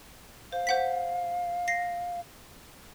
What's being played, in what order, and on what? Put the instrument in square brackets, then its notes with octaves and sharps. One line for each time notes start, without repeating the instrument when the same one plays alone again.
[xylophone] C5 [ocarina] F5
[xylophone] C5 F#5 B6
A#6 C7